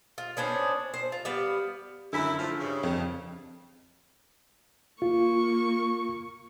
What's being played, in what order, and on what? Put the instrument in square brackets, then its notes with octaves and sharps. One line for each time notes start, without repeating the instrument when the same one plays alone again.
[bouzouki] F4
B3 C#4 D4 C5
C5
F4
G3 B3 F5
[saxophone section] F#2 E4 [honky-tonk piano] D3
[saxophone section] A2 F3
G2 C#3
[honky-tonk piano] F2
[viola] A#3 C#6 [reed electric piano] F4